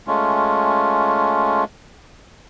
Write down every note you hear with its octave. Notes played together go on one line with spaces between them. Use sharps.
G#3 A3 C#4 F4